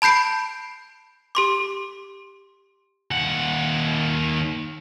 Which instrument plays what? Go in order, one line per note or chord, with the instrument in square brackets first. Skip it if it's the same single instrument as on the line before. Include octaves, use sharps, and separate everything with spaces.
[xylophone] A5 B5 G6 C7 D7
G4 C6 D6
[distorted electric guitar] D#2 F#5